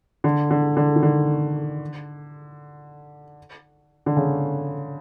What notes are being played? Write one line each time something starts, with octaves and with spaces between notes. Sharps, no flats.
D3
D3
D3
D#3
D3
D3
C#3